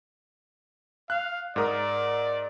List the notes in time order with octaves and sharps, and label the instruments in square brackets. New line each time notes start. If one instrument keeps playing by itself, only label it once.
[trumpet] F5 [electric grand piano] F#6
[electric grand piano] G#2 A#4 D#6 [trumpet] D5